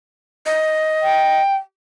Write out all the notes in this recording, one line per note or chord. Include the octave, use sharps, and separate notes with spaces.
D#5
G5